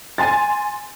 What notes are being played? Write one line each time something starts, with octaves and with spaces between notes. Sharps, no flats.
G#5 C6 A6